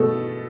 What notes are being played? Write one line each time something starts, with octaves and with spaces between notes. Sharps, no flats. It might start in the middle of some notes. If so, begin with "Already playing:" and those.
Already playing: B2 A3 A4